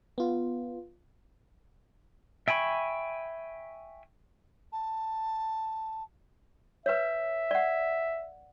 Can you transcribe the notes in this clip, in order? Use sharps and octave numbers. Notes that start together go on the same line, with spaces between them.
B3 F4
E5 G5 G#5 B5 C#6
A5
B4 C#5 E5
D5 F#5